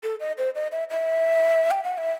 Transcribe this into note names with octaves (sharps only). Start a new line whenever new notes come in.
A4
D#5
C5
D#5
E5
E5
G5
F#5
E5